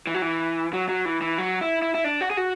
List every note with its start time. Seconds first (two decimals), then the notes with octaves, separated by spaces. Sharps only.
0.07 E3
0.14 F#3
0.22 E3
0.73 F#3
0.89 F#3
1.05 E3
1.21 E3
1.38 F#3
1.61 E4
1.82 E4
1.94 E4
2.04 D4
2.21 F#4
2.30 G#4
2.37 F#4